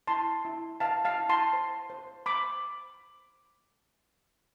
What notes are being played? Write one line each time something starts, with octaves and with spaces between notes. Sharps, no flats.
E4 A5 C6
E4
B4 F5 A5
F5 A5
E4
A5 C6
C5
C5
C5 B5 D6